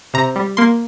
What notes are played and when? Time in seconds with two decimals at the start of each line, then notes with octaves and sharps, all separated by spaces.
0.14 C3 A#5
0.36 G3
0.57 A#3 C6